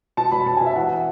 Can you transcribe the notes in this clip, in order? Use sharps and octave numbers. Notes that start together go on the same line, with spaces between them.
B2 A5
B2 B5
B2 A5
B2 G#5
E5
E2 F#5